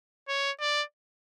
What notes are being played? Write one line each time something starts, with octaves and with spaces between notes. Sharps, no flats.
C#5
D5